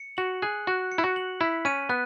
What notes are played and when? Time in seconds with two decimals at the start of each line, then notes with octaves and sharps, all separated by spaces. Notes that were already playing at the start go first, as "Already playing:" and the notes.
Already playing: C#7
0.17 F#4 F#7
0.42 G#4 F#6
0.67 F#4 F#6
0.92 C#7
0.98 E4
1.04 F#4
1.16 F#7
1.40 E4 B6
1.65 C#4 D#7
1.89 B3 F#6